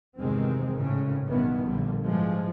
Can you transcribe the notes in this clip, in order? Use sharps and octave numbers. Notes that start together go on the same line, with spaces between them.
E2 G2 C3 D#3 G#3 C4
G#1 A2 C#3 C#4
B1 G2 D#3 E3 B3
A#1 A#2 D3 G3
G#2 E3 F3 G3 G#3